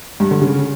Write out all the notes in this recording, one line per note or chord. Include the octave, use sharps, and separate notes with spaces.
G2
D3
C#3